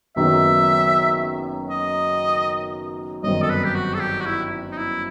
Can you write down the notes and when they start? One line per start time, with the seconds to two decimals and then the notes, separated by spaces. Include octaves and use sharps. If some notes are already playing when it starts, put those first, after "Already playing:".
0.16 F#1 F#2 D#3 F#3 B3 E5
1.70 D#5
3.23 G1 F#2 D#3 F#3 C4 D#5
3.42 A4
3.50 B4
3.64 G4
3.75 F#4
3.94 A4
4.00 G4
4.21 F#4
4.26 E4
4.71 D#4
4.77 E4